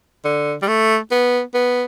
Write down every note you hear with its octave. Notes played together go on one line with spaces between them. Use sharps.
D3
G3
A3
B3
B3